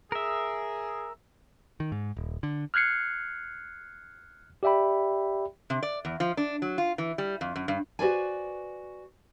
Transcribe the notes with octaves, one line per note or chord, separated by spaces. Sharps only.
G#4 A#4 E5
D#3
G#2
D#1
D3
F6 F#6 G#6 C7 C#7
G4 D5 E5 G5 B5
C3
D5
E2
F3
D4
F#3
F4
E3
G3
F2
F#2
G2
F#4 G#4 B4 C5 D5 G#5